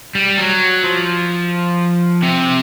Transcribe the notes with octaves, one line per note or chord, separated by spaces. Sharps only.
G3
F#3
F3
C3